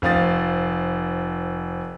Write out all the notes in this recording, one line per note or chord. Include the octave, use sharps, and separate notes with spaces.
F1 C4 F5 D#6 A6